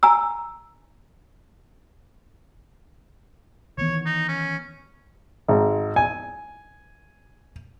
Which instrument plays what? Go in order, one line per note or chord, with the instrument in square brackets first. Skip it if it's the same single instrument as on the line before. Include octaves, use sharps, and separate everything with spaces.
[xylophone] G#5 A#5 E6
[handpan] D#3 E3 B3 [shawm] C#5
[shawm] D#4
C#4
[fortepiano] G#1
G#5